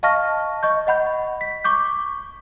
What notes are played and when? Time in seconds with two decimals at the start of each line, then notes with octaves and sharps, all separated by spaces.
0.03 D#5 F5 A5 C#6 F6 A#6
0.63 D#5 C#6 G6
0.87 D#5 F#5 B5 G6
1.41 B6
1.64 C#6 D6 G6